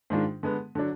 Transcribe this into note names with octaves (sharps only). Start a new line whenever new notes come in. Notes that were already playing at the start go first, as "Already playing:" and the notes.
G#2 D#3 G#3 D4 F4
D3 G#3 B3
D3 F#3 D4